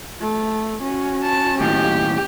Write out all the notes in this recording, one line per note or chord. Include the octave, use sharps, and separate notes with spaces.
A3
C#4 F#4
A5
D#2 A2 G4